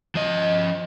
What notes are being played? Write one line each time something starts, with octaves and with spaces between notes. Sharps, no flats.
F3 D#5